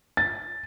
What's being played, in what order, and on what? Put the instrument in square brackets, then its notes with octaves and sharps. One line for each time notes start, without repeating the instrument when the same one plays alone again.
[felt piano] A6